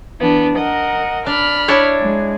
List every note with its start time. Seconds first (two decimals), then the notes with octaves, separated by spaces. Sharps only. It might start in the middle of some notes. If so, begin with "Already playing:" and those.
0.19 E3 B3 D4
0.55 A#4 D#5 F#5
1.26 D4 B5 F6
1.68 D4 E4 C#5
1.99 G#3